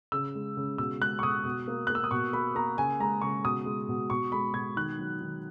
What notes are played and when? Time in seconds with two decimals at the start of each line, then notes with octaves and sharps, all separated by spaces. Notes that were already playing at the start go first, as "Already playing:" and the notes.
0.12 C#3 E6
0.35 G#3
0.57 C#3
0.78 B2 E6
1.01 G#3 F#6
1.19 C#6
1.23 B2 D#6
1.45 B2
1.68 A#3
1.87 A#3 F#6
1.95 E6
2.04 D#6
2.11 B2 C#6
2.33 A#3 B5
2.55 A#3 A#5
2.78 C#3 G#5
3.00 G#3 A#5
3.21 C#3 C#6
3.45 B2 D#6
3.66 G#3
3.89 B2
4.10 B2 C#6
4.32 G#3 B5
4.54 B2 G#6
4.76 D#3 F#6
4.99 F#3
5.21 D#3